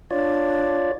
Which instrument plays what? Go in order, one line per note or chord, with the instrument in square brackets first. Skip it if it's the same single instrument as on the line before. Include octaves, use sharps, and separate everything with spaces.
[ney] D4 [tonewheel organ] F4 C#5 D5